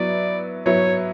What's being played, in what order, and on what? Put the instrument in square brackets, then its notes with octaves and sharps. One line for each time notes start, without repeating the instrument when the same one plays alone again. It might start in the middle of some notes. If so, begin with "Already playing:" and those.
Already playing: [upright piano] F#3 B3 E4 [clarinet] D5
[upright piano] F#3 B3 E4 [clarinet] C#5